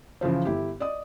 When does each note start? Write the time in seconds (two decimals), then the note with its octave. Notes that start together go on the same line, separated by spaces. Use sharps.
0.21 C#3 E3 F3 C5
0.45 G1 E4 G4
0.80 D5 D#5 D#6